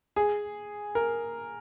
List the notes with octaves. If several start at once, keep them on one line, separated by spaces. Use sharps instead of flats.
G#4
A#4